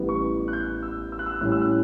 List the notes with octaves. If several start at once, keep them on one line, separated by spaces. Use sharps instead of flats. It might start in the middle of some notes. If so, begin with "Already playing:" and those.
Already playing: A1 A2 G3 B3
C#6
F#6
G6
E6
E6
F#6
E6
A2 G3 C#4 F#6
E6
F#6